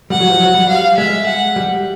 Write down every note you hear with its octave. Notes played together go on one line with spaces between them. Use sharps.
G3 F#5
F#3
F3
F#3
G3
F5
G#3 E5
F#5
G3